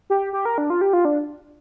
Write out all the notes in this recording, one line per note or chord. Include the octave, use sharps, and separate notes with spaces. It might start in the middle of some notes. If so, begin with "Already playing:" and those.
G4
G4
A#4
D4
F4
G4
F4
D4